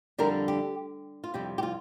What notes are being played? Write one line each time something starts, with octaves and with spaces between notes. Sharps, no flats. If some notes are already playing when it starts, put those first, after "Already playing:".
F2 D3 G3 D4 A#4
G4
F4
F2 C3 G3 G4
G4
F4